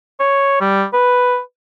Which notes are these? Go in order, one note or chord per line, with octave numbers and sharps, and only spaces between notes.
C#5
G3
B4